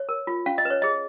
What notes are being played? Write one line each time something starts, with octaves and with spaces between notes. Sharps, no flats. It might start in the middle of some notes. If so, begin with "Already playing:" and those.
Already playing: C#5
A#4
F4
C#4 F5
D#5
B4
C#5
G#4 D#5